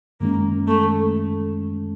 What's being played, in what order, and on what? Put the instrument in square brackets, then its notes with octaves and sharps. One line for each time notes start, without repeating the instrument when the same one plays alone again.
[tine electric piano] F#2 D#3 G#3 C#4 [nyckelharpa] A#3
[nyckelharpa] A3